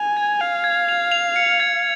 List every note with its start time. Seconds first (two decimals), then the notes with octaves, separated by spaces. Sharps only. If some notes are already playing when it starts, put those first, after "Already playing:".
Already playing: G#5 F7
0.17 G#6
0.40 F5 F7
0.64 G#6
0.89 F7
1.12 F7
1.36 C#7
1.60 G#6